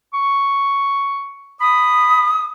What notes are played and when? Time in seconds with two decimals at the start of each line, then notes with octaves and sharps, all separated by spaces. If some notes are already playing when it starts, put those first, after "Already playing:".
0.13 C#6
1.61 B5 D#6